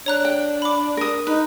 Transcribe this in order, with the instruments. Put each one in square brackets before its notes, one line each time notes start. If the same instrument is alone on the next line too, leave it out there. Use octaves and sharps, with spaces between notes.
[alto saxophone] D4 [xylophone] C#5 A#5 F#6
[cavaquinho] G5
[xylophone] B5 D6
[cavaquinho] A#4 D#6
[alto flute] D#4 [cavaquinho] B4